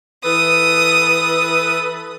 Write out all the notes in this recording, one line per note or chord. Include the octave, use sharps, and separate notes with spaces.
E3 A4 B4 D#6